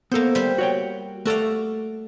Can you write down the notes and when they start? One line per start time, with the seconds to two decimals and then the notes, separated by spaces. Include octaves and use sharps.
0.12 A#3 B3 A4 C5
0.35 G3 C5
0.58 F#4 C#5 G5
1.25 A3 F#4 A4 D5 F5